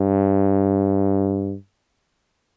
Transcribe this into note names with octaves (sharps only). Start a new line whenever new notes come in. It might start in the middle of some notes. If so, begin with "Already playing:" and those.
Already playing: G2